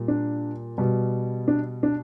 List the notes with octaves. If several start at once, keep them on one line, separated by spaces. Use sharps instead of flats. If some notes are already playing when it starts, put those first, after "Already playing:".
Already playing: A#2 G3
D4
B2 G3
D4
D4